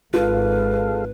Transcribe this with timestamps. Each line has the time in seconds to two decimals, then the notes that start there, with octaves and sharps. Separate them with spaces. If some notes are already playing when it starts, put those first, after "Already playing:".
0.14 G#1 G#3 F4 A4 B4 F5